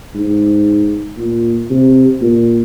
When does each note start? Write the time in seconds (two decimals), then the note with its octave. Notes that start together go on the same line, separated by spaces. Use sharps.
0.15 G#2
1.18 A#2
1.70 C3
2.21 A#2